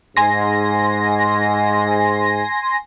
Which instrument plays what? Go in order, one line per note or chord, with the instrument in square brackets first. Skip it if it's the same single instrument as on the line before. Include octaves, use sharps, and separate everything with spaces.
[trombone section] G#2 [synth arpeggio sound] G#5 C6 A#6